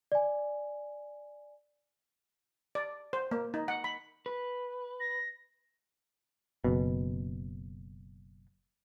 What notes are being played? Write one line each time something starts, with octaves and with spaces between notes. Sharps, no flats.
D5 G#5
D5
C5
A#3
D#4
F#5
B5
B4
A#6
F#1 B2